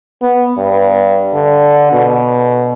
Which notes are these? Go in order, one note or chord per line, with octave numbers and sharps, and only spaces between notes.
B3
G2
D3
B2